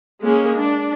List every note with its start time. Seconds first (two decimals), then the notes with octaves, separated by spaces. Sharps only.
0.22 G#3 A#3 C#4 G#4
0.57 D4